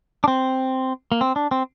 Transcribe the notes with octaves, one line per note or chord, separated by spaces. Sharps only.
D4
C4
A#3
C4
D4
C4